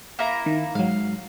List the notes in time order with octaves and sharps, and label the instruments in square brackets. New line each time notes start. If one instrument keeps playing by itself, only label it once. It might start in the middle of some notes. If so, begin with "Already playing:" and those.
[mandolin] A#3 E4 A#5
[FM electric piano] D#3
[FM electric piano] G#2 F#3 [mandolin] F5